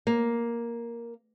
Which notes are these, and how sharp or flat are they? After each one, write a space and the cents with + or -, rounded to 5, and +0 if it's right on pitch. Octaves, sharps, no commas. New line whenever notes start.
A#3 +5